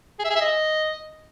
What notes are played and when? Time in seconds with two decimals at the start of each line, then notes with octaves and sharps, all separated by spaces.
0.19 G#4
0.25 E5
0.30 G#4
0.35 E5
0.41 D#5